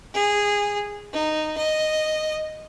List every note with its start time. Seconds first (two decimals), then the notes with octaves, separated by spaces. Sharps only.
0.14 G#4
1.13 D#4
1.58 D#5